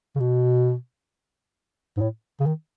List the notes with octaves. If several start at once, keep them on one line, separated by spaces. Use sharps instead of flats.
C#3
B2
G#2
A2
C#3
D#3